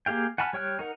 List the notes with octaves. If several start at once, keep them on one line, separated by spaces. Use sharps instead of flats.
A#3 G4 G#4 F5 G5
F#5 G#5 A5 B5 F6
G3 C#5 G5 F6 F#6
D#4 A#4 F#5